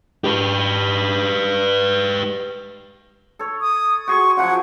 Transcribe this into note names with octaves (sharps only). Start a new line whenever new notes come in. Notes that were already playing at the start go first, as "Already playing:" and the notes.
G4 B4
A4 C#5
D#6
F#4 G#4 C6 C#6
C#3 F3 F#3 F#5